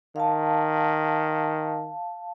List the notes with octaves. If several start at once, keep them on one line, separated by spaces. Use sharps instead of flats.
D#3 F5 A5